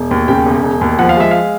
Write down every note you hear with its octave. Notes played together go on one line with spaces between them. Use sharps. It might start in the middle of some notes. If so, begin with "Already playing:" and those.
Already playing: E1
D#2
C#3 G5
E1
E1
D#2
F3 F#5
F5
G#3 E5
F5